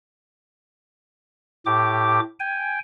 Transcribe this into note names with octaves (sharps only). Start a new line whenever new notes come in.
A2 G4 D6
G5 G#5